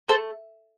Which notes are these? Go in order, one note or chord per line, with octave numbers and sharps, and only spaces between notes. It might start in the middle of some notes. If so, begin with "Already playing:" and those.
A3 A4 C5